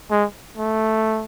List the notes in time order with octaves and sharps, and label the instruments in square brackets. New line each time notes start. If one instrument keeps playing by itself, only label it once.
[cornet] G#3
A3